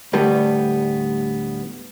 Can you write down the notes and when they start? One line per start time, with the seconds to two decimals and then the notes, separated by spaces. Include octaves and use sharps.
0.13 D2 A2 G3 A3 B3